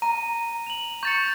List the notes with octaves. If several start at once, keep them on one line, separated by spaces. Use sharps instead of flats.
A#5 D#7
F7 F#7
C#6 G6 A6 C#7 F7